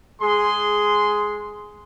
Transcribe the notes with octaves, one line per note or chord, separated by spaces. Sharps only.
G#3 G#4 C6